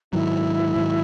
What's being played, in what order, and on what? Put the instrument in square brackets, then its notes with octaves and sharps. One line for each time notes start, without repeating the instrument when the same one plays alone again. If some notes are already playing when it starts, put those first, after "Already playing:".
[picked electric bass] G#2 D#3 F#3 [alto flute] E4
[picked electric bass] G#2 D#3 F#3